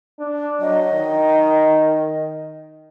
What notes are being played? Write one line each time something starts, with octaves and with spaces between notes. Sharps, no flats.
D4
F#3 D#5
D#3